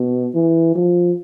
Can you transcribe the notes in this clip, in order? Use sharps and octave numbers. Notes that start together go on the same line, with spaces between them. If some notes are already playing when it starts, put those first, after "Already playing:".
Already playing: B2
E3
F3